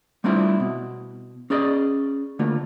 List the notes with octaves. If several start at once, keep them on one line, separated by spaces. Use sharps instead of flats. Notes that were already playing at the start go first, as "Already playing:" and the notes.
G3 A3 C4 D4 E4 F4
B2
C#4 G#4 D5 D#5
D3 A3 A#3 F4